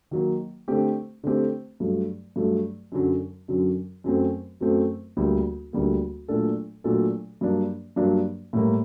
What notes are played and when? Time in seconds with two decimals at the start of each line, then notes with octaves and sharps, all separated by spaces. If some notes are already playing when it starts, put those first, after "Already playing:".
0.11 D#3 F#3 A#3
0.68 D3 A3 C4 G4
1.24 D3 A3 C4 G4
1.80 G2 F#3 A3
2.36 G2 F#3 A3
2.92 F#2 D3 F#3
3.48 F#2 D3 F#3
4.04 F#2 F#3 A3 C4
4.61 F#2 F#3 A3 C4
5.17 D2 D3 G3 A#3
5.73 D2 D3 G3 A#3
6.28 A#2 F#3 A3 D4 A4
6.84 A#2 F#3 A3 D4 A4
7.41 G2 F#3 A#3 D4
7.96 G2 F#3 A#3 D4
8.53 A2 G3 A#3